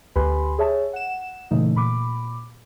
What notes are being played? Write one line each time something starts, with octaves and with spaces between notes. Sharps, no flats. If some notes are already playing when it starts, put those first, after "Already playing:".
D2 G4 B4 G#5 B5 C6
G#4 C#5 E5 A5
F#5 E7
A#2 C#3 E3 A3 D#4
A#2 B5 D6